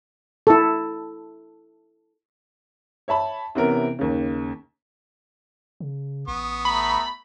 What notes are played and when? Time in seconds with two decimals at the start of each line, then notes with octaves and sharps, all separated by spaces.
0.47 E4 A4
3.08 C#5 E5 A5 B5
3.55 C3 E3 B3 C#4 A#4
3.99 D#2 C#3
5.80 C#3
6.28 A1 B3 C#6 D#6
6.65 A3 A#5 B5